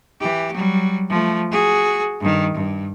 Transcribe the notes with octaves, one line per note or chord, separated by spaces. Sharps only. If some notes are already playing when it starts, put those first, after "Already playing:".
E3 G4
F#3 G3
F3 A3
F#4 G#4
G2 D#3
G2